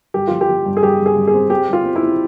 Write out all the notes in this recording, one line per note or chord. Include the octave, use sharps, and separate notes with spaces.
G2 G4
F3 F4
G4
F3
G2
G#4
G2 G4
G2
G#4
G2
G#4
C4
C4 G4
G3 F4
C4
E4
C4